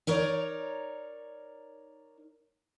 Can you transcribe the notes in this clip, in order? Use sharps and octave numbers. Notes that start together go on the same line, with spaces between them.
D#4 A#4 C#5 D5